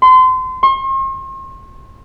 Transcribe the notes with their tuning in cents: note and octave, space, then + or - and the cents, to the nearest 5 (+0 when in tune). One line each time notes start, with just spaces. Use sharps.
C6 -30
C6 +45